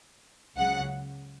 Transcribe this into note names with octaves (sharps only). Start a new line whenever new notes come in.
C#2 C#3 F#3 F#5